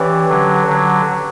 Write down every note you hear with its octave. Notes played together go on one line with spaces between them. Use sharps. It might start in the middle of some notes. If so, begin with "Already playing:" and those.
Already playing: E3 C#4 G4 B4 D5
D3 F#3
D3 F#3